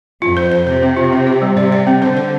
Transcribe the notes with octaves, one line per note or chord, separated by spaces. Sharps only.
F2 F4
C5
C5
C3 C5
C4
F4
C4
G4
G3
C3 D5
D5
C4
D3 C5
C5